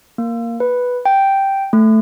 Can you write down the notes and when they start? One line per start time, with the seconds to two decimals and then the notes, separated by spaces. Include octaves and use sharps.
0.18 A#3
0.60 B4
1.06 G5
1.73 A3